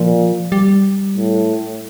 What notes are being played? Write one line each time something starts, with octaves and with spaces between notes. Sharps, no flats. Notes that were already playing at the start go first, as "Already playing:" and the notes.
Already playing: A#2 F3
G3
A2